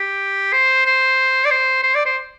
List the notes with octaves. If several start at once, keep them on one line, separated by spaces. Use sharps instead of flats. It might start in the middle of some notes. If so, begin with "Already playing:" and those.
Already playing: G4
C5
C5
D5
C5
C5
D5
C5